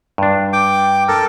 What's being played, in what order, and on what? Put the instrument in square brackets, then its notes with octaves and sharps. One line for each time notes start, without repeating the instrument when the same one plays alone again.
[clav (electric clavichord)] G2 D4
[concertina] G5 D6
A4 A#4